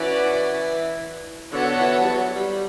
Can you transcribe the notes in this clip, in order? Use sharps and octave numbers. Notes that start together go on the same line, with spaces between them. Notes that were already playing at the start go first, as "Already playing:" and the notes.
Already playing: E3 C#4 F#4 B4 D5
D3 B3 F#4 A4 C#5 F#5
E3
G3
F#3
G3